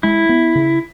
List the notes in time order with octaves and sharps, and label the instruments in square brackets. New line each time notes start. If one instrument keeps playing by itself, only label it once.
[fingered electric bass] G#3 [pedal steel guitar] E4
[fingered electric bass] B3
C#3